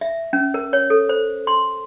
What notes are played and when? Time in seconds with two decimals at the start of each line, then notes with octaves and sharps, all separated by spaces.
0.01 E5
0.33 C#4
0.54 A#4
0.73 C#5
0.90 A4
1.09 C5
1.47 C6